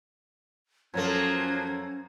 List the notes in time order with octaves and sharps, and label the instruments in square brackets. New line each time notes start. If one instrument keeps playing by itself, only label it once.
[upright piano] F#2 A4 [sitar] F3 F#3 A#3 [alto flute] C#4 [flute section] C5 G#6